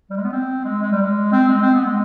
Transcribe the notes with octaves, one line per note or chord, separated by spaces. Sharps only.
G3
G#3
B3
C4
G#3
G#3
G3
G#3
C4
G#3
C4
B3
G#3